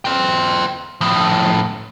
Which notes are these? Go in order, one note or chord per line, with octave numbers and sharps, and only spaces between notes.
F4 G5
A2 F3